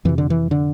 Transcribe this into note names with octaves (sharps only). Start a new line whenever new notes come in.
F2 C3 E3
D3
E3
D3